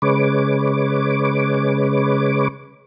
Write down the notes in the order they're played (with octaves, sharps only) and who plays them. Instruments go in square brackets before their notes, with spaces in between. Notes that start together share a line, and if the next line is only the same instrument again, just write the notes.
[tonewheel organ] C#3 G#3 B4 C#5 D6